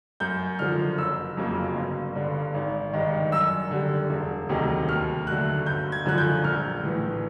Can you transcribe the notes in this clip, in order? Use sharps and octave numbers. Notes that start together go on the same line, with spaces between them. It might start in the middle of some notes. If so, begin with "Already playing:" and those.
F#2 G6
D3 F3 F6
F#1 E6
F2 C#3 F#3 A#3
G1
G2 D3
G#1
G2 D#3 G#3
F#2 E6
D3 G3
E1
D2 C3 D#3 F#3
D#2 F6
D3 F#3 A3 F#6
G1 G6
G#6
F#2 D3 F3 F#6
G6
A#1 F6
A2 E3